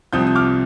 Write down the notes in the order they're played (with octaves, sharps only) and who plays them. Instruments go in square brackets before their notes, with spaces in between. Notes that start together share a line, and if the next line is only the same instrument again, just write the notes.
[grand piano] C2 C3 F3 C4 D#6 G6
D#6
D6 F6